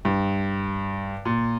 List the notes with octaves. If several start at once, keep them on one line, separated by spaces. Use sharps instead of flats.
G2
A#2